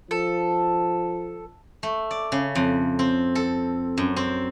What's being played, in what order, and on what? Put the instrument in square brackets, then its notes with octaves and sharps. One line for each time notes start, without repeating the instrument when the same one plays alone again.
[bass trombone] F3 [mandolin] A4
[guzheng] A3
D5
C#3
F2
C4
A4
F#2
C4